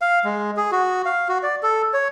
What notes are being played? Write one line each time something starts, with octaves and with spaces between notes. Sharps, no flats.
F5
G#3
G#4
F#4
F5
F#4
D5
A4
C#5